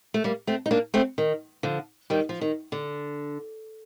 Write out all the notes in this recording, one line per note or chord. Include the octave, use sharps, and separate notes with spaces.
A3
G3 A#3
A3 C4
D#4
A#3 D4
A3 C4
D#3
D3 F3
D#3 G3
F3
D#3
D3